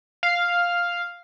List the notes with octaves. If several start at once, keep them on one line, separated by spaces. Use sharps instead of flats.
F5